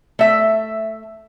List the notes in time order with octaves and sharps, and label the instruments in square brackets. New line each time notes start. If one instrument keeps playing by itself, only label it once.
[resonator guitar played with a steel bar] A3 E5